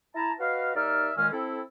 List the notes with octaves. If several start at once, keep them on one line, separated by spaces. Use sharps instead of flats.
E4 A5 A#5
F#4 B4 D#5 F5
D#2 D#4 D5 E5 F6
A#2 D#3 G#3 C#4 F5 F6
C4 E4 A4